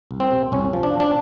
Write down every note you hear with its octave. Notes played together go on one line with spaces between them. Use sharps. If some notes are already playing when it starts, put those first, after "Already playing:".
C2
C4
C3
C2 C#4
F3
D4
F3
D4